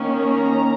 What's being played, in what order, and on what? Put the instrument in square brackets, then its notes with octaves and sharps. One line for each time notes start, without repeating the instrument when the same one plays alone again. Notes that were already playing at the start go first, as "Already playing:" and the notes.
Already playing: [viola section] D#3 A#3 C#4
A#5